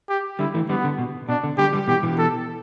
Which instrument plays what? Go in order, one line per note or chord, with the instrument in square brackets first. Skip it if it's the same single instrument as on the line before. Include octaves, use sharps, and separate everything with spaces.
[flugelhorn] G4
[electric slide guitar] D3 G3 [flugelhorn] E4
[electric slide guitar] E3 A3
[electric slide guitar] D3 G3 [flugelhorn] B3
[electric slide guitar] D3
B2
[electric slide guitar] B2 [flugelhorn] D4
[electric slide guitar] D3
[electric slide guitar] D3 G3 [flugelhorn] G4
[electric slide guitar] D3 G3
[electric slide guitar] B2 E3 [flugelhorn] G4
[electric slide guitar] B2 E3
[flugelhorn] A4